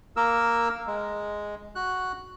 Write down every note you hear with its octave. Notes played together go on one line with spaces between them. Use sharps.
A#3 A#4 E6
G#3
F#4 F#6